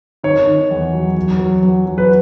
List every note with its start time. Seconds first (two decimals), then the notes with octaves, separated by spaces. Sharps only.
0.23 D#3 C#5
0.47 D#3
0.71 E2
0.93 F#3
1.17 F#3
1.39 F#3
1.63 F#3
1.86 F#3
1.98 B4